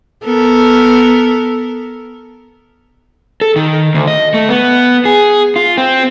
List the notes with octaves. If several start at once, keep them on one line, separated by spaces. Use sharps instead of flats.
B3 A4 A#4
A4
D#3
D2
D#5
A3
B3
G#4
F4
C4